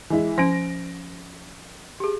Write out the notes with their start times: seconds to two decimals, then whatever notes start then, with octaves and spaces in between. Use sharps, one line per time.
0.10 E3 G#3 E4
0.38 F3 C#4 A#6 D7
2.00 G4 G#4